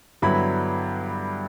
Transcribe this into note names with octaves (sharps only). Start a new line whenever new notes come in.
G2 D3 F#3 B3 E4 B5